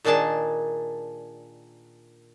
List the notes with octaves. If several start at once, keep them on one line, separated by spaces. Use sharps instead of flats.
A#2 D#3 D4 G#4 A5